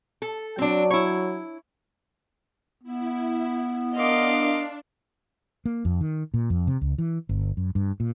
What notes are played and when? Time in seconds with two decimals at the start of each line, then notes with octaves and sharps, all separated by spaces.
0.22 A4
0.58 F#3 C4 D4
0.90 E4 C#5
2.83 B3 E4
3.95 D4 A#4 D#5 F5 C6 D6
5.65 A#3
5.85 F2
6.01 D#3
6.34 A#2
6.50 F2
6.67 C3
6.81 C#2
6.98 E3
7.29 G1
7.57 F#2
7.75 G2
8.00 A#2